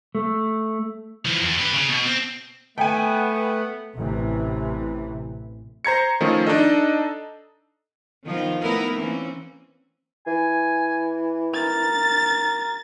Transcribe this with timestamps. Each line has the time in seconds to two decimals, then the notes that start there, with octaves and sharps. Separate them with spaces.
0.15 A3
1.25 E3 F3
1.41 E2
1.58 G4 B4
1.73 C#3
1.88 B2
2.06 C4
2.78 A3 B3 G5 G#5
3.96 A1 C3 E3
5.85 C5 A#5 G#6 C#7
6.21 D#3 F3 A3 C#4
6.47 D4 D#4 A4 D#5
8.24 D#3 F3 B3 F4
8.62 A3 B3 D#4 E4 A#4 B4
8.92 E3 A#3 C4 C#4
10.27 E3 G#5
11.54 A#4 A6